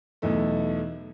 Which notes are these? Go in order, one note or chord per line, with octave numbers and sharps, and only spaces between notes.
B1 E2 A3